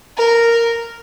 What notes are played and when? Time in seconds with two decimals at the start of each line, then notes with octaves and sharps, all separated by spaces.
0.17 A#4